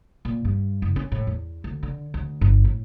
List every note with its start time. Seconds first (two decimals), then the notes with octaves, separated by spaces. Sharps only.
0.25 A#2
0.45 G2
0.82 F#1
0.96 C#4
1.12 A2
1.27 E2
1.64 D2
1.83 D3
2.14 D2
2.41 G1
2.65 A2